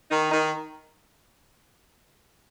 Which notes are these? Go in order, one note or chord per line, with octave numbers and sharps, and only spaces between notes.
D#3 D#4
D#3 D#4